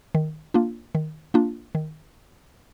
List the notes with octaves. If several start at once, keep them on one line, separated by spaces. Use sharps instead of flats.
D#3
A#3 D4 F4
D#3
A#3 D4 F4
D#3